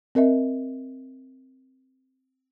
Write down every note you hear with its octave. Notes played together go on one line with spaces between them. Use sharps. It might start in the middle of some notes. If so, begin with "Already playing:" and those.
C4 A#4 D#5 E5